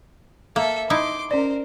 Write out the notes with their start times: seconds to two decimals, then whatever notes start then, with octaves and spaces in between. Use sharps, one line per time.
0.56 A#3 A4 E5
0.90 D#4 E4 E5 C6 D6
1.31 C#4 A#4 C5 D5